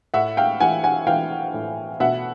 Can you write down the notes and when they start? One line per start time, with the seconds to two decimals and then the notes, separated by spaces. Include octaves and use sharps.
0.14 A2 E5 F#5
0.37 F5 G5
0.60 E3 F#5 G#5
0.84 F#5 G#5
1.07 E3 F5 G5
1.54 A2
2.00 B2 E5 F#5